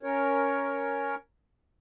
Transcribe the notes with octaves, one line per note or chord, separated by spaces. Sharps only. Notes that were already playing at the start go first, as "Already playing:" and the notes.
C#4 A#4 C#5